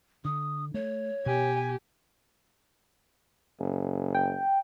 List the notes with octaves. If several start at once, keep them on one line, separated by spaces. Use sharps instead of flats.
D3 D#6
A3 C#5
B2 G4 G#5
F#1
G5